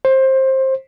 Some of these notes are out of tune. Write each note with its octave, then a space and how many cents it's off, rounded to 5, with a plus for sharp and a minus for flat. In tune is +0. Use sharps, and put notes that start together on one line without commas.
C5 +20